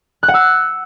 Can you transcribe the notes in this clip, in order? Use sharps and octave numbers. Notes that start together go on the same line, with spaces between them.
F#6
F#5
E6